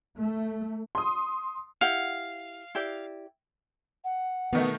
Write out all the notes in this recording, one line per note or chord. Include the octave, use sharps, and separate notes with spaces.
A3
C6 D#6
E4 G4 F5 F#5
E4 G4 D5
F#5
B2 D#3 A3 B3